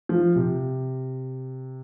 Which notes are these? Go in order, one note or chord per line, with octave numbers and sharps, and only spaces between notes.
F3
C3